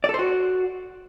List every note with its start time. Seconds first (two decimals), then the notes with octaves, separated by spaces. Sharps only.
0.04 D5
0.09 A4
0.14 C5
0.19 F#4